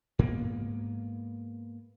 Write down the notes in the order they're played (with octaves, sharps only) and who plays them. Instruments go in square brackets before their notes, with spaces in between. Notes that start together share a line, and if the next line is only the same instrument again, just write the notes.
[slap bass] G#2 A#3 B3